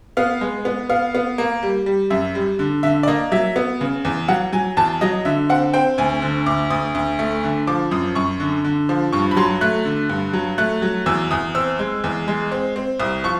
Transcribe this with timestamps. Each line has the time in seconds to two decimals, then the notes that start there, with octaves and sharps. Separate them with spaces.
0.17 B3 F5
0.41 G#3
0.65 B3
0.90 B3 F5
1.15 B3
1.38 A#3
1.63 G3
1.86 G3
2.10 F#2 E5
2.35 G3
2.59 D3
2.83 D3 E5
3.03 D5
3.08 A#3 D#5
3.32 F#3 E5
3.56 B3
3.81 C#3
4.05 E2
4.28 F#3 F#5
4.53 F#3 G#5
4.77 E2 A5
5.01 F#3 D#5
5.25 D3 E5
5.49 C4 F#5
5.74 C4 G5
5.98 D2 G#5
6.22 D3
6.46 D2 D6
6.70 D2 D#6
6.95 D2
7.19 A3
7.44 D3
7.67 F3 D6
7.91 F#2 D#6
8.15 F#2 C#6
8.40 D3
8.64 D3
8.89 F3
9.13 G2 C#6
9.31 B5
9.37 F#3 C6
9.61 A3 F#6
9.85 D3
10.09 G2
10.33 F#3
10.58 A3 F#6
10.82 F#3
11.06 E2 E6
11.31 E2 D#6
11.55 C4 E6
11.79 G#3
12.04 E2
12.28 G#3
12.52 C4
12.76 C4
13.00 C2 D#6
13.24 F3 C#6